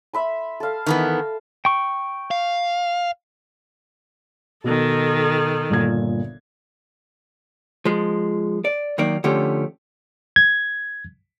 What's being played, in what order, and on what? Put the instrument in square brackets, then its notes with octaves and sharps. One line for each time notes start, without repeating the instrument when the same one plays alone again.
[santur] E5 B5 C6
A4 F5
[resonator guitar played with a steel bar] D#3 E3 B3
[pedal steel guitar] G5 C#6
[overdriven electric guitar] F5
[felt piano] B2 [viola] D#3 A4
[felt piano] G1 A#2 G#6
[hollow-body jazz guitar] F3 G#3
D5
D#3 F#3 A#3 D#4 D5
D3 F3 A3 C#4 G4
[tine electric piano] G#6